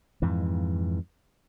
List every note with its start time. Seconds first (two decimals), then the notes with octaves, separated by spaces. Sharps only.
0.22 F2 G#2 E3